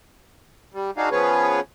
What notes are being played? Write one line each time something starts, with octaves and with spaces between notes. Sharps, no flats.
G3
D4 D#4 F#4 G#4 F5
F3 B3 C#4 G#4 B4 C#5